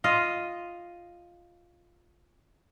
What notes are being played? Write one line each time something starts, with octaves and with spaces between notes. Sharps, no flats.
F4 D#5 F5